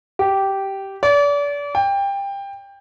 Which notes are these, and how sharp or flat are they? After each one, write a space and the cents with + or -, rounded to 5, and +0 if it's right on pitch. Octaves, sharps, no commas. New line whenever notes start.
G4 -10
D5 -35
G5 +20